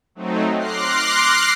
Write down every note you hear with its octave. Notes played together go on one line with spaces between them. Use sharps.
F#3 A3 C4 D#4
C6 D6 F6 F#6 A#6 C7